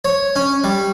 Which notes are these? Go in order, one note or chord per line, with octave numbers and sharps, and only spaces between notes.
C#5
C#4
G3